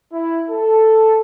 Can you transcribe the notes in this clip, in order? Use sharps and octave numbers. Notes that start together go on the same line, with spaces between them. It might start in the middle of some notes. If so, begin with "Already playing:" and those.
E4
A4